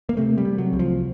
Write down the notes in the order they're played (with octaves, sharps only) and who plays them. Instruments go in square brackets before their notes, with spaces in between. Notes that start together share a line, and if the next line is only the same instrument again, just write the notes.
[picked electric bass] A#3
C3 A3
G3
C3
F#3
C2
F3